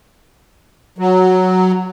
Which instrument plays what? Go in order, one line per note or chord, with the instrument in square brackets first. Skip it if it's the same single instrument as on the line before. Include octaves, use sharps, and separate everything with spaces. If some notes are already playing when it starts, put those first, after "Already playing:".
[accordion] F#3